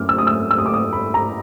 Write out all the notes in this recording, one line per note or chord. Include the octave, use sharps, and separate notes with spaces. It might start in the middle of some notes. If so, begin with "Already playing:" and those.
Already playing: F#2 D6 F6
E6
D#6
E6
E6
D#6
D6
D#6
B5
A#5